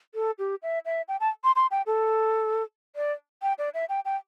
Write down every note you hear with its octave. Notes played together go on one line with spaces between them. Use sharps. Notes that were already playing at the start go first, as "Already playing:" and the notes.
A4
G4
E5
E5
G5
A5
C6
C6
G5
A4
D5
G5
D5
E5
G5
G5